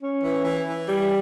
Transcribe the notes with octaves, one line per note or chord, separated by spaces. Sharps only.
C#4
E3
E3
E3
G3